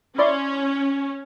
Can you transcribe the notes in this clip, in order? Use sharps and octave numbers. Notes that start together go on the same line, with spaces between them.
C#4 E4 D5 C6